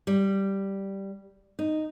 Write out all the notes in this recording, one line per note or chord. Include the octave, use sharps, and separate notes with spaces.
G3
D#4